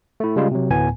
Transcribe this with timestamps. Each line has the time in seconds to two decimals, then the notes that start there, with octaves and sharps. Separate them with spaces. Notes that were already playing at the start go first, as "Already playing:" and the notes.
0.20 A3 E4
0.36 C#3 G3 G#3 F4
0.51 C3 F#3
0.70 D2 A2 B3 G#5